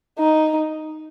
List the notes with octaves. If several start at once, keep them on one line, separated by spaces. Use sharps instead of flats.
D#4